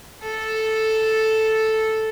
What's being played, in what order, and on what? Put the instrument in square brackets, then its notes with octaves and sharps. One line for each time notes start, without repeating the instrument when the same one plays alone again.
[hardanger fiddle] A4